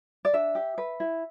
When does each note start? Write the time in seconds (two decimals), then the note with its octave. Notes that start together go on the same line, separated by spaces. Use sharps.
0.25 D5
0.33 D4 E5
0.55 G4
0.78 B4
1.00 E4